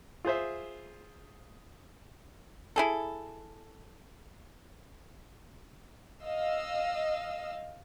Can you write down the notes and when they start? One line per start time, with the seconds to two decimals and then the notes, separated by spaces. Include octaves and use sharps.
0.25 F4 G#4 C5 E5
2.76 E4 G#4 A4
6.24 D#5 F5 E6